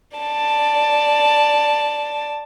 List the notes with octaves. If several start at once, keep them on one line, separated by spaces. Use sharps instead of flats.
D5 A5